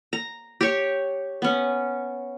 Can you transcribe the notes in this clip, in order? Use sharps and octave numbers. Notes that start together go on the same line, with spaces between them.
A#5
G4 C#5
B3 C#4